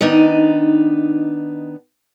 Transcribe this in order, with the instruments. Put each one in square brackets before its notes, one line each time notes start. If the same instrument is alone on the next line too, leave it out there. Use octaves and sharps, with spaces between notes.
[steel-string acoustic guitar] D#3 B3 D4 D#4